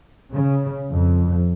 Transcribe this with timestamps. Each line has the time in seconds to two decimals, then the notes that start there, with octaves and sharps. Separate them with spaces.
0.34 C#3
0.92 F2